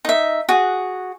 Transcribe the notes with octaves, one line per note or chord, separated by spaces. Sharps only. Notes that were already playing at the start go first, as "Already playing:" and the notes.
D#4 E5
F#4 G#4